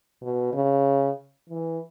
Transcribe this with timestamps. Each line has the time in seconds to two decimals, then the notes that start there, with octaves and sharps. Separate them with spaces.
0.22 B2
0.53 C#3
1.50 E3